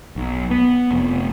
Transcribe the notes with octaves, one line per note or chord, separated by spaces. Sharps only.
B1
B3
F1